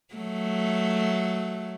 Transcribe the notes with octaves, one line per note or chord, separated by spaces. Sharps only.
F#3 A3